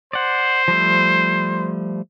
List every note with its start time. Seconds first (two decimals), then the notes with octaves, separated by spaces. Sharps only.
0.13 C5 D5 F#5
0.68 F3 G3 A3